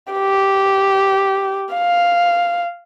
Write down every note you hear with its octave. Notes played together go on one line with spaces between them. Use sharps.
G4
F5